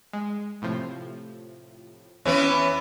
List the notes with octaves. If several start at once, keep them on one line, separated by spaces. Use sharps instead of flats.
G#3
A2 C3 F3
F2 E3 B3 C#4 C#5